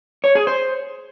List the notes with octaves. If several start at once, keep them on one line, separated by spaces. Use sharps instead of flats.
C#5
G#4
C5